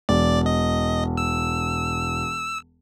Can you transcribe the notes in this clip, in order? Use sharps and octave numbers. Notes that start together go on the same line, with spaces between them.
E1 D5
D#5
E6